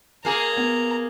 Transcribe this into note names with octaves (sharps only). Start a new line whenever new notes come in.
A#3 G#4 A#5
B3